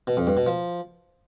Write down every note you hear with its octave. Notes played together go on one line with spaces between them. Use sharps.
B2
F2
G2
B2
F3